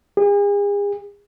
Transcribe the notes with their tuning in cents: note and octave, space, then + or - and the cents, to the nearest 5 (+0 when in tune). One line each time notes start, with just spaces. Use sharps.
G#4 -40